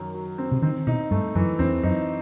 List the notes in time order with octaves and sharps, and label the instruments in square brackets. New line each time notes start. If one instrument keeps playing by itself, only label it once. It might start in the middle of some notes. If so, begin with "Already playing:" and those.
Already playing: [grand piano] F#2 D#3
F#3
C4
[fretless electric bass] C3
[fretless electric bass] D#3 [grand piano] C4
[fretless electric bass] B2 [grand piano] D#4
[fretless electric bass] G2 [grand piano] A3
[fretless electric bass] F#2 [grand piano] E3
[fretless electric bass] E2 [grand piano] C4
[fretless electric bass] F#2 [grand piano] D#4